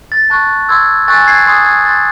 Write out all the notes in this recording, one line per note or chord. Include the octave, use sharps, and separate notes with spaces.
A6
A5 C#6 F#6 A6
C6 E6 G#6
G#5 C#6 F#6 A6
G#6 C7
G#5 C6 D#6 G#6 C7
G#6
C6 F#6 A6